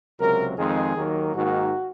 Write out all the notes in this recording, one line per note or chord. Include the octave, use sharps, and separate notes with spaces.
C#2 C3 F#3 A#4
F2 D#3 G#3 C4 G#4
D#2 D#3 F#3 A#3
G#2 D#3 A#3 F#4